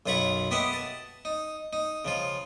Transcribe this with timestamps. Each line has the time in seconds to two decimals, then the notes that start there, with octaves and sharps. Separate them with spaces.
0.06 B1 F#2 F4 A#5 B5 C#6
0.51 B3 G4 D#5 E5 F#5
0.73 A5
1.25 D#4
1.73 D#4
2.05 C#3 F3 F4